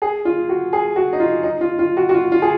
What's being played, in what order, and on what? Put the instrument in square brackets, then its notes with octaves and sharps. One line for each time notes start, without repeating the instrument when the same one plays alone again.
[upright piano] G#4
F4
F#4
G#4
F#4
D#4
F4
D#4
F4
F4
F#4
F#4
F4
F4
G#4